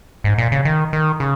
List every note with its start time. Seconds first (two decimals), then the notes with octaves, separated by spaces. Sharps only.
0.24 G#2
0.38 A#2
0.52 C#3
0.65 D#3
0.93 D#3
1.20 C#3